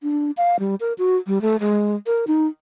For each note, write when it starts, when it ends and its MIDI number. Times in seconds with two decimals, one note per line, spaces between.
0.03 0.31 62
0.37 0.59 77
0.59 0.75 55
0.80 0.93 70
0.98 1.16 66
1.27 1.38 55
1.42 1.56 57
1.60 1.96 56
2.06 2.25 70
2.27 2.47 63